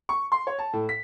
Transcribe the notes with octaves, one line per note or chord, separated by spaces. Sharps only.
C#6
C6
C#5
A5
A2
B6